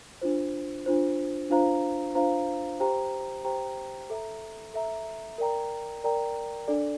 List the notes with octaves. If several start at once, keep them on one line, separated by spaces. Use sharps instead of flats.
D4 F4 C5
D4 F4 C5
D4 F4 C5 F5 A#5
D4 F4 C5 F5 A#5
G4 C5 G5 A#5
G4 C5 G5 A#5
A4 E5 A#5
A4 E5 A#5
A#4 D5 G5 A#5
A#4 D5 G5 A#5
D4 A4 D5